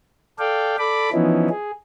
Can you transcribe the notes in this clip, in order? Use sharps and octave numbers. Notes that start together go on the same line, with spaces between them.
A4 D5 F5 G5
A4 D5 B5 D6
E3 F3 B3 C#4 D#4 E4
G#4